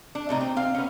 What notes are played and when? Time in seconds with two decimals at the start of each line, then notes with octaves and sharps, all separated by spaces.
0.15 D4
0.29 A2 C3 D#4
0.41 C4
0.56 C4 F5
0.75 B3 C#4